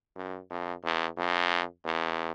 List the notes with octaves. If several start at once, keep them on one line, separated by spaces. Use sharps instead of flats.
F#2
F2
E2
F2
E2